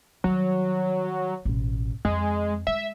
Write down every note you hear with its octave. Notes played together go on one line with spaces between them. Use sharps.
D#3 F#3 G3
A1 B2
F2 G#3
G#3 E5